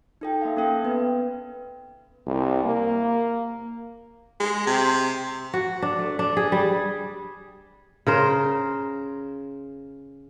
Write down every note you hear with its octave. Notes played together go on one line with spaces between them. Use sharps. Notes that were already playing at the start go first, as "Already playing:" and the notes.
D#4 A4 G5
A#3 E5 F5
A#3 C#4 A4 G5
B3 B4
C2
A#3
G#3
C3
F#4
D4
A3
D4
G#4
G3
C#3 A#4 C5